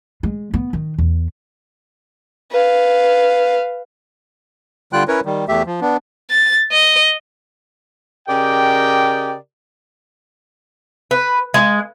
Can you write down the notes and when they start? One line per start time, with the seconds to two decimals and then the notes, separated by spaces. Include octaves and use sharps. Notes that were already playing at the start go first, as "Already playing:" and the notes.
0.23 G#3
0.54 B3
0.73 D#3
0.98 E2
2.51 B4 F5
4.93 D3 G3 F4 G5 F#6
5.08 C#4 E4 A#4 B4 C#5
5.25 D#3 G3
5.48 E2 A3 G4 E5
5.66 F3
5.81 B3 D4
6.30 A6
6.72 D#5
8.29 C#3 G4 A#4 D5 D#5 G5
11.11 B4
11.54 G#3